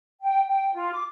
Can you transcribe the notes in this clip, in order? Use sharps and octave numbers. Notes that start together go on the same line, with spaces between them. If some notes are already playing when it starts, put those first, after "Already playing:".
G5
G5
F4
D6